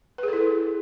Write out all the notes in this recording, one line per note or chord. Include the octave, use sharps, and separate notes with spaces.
E4 G#4 A4 B4